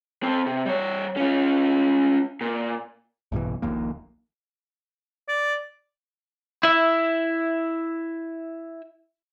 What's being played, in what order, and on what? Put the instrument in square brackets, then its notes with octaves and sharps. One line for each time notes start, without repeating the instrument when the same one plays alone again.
[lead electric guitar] C4 A4
C3
G3 C#5
C#4 F4
A#2
[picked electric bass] A#1 G2 B2 E3
D#1 A#1 D#2 A#3
[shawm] D5
[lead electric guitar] E4 E5